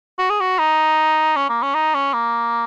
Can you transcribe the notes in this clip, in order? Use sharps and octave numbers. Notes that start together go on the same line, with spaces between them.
F#4
G#4
F#4
D#4
C#4
A#3
C#4
D#4
C#4
A#3